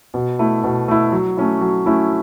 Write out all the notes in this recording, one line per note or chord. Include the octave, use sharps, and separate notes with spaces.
B2
A3 E4
B2
A3 E4
F#3
A3 C#4 E4
F#3
A3 C#4 E4